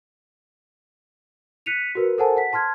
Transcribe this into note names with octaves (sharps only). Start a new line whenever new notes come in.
F#6 B6 C#7 D#7 F7
F#4 A#4 B4
A4 A#4 C5 F#5 G#5 A5
F#5 B6
A5 C6 F6 G#6